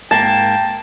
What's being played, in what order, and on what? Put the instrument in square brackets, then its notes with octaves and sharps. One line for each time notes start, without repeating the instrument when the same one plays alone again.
[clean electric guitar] G#2 A#3 [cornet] G5 [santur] A5